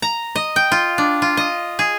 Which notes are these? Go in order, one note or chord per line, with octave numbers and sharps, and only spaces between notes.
A#5
D#5
G5
F4
D4
F4
D#5
G#4